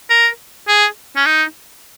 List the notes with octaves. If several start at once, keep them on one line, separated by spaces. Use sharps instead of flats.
A#4
G#4
C#4
D#4